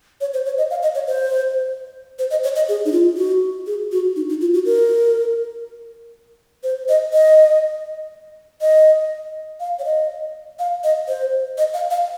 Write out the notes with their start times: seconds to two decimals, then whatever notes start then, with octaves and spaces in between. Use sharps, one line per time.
0.21 C#5
0.34 C5
0.46 C#5
0.58 D#5
0.71 F5
0.82 D#5
0.95 C#5
1.07 C5
2.19 C5
2.31 D#5
2.43 C#5
2.56 D#5
2.69 G#4
2.85 D#4
2.92 F4
3.17 F#4
3.67 G#4
3.92 F#4
4.16 D#4
4.29 D#4
4.41 F4
4.54 F#4
4.65 A#4
6.63 C5
6.89 D#5
7.13 D#5
8.61 D#5
9.60 F5
9.79 C#5
9.85 D#5
10.59 F5
10.84 D#5
11.08 C5
11.58 D#5
11.74 F5
11.91 F5